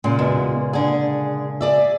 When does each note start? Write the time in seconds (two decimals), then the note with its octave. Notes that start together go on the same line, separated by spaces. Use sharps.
0.04 A#2 C#3 G#3
0.19 E2 B2
0.73 D3 G#4
1.61 G#4 D5 E5